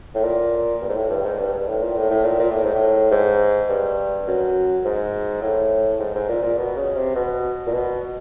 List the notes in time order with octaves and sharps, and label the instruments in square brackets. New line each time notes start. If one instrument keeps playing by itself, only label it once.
[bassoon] A2
A#2
G2
G#2
A2
G2
G#2
G2
G2
A2
A#2
A2
A2
A#2
A#2
A2
G#2
A2
G#2
G2
F#2
G#2
A2
G#2
G#2
A#2
A#2
B2
C#3
C3
B2
A#2
B2